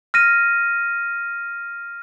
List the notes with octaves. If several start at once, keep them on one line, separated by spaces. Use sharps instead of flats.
F6 A#6 D#7